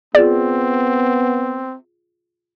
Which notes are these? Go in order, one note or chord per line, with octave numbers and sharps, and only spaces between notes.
B3 C4 F4 G#4 D5